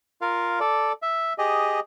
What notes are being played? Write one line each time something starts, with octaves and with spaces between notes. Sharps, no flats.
F4 A#4 F5
A4 D5
E5
G4 G#4 D#5